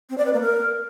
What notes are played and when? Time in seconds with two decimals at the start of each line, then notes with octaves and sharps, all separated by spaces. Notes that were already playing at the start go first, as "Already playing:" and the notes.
0.10 C4
0.18 D5
0.26 B4
0.33 A#3
0.41 A#4